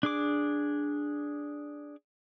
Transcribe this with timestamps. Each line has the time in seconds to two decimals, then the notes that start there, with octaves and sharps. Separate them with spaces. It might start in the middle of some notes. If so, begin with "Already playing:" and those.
0.03 D4 G#4 D6